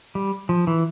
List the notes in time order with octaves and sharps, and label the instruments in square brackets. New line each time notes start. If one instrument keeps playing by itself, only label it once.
[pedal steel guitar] G3
F3
E3